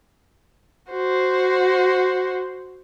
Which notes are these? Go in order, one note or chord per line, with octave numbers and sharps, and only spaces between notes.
F#4 C5